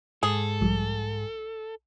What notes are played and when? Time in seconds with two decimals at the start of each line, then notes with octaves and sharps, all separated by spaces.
0.23 G#2 G#4 A4
0.61 B1 F3 G3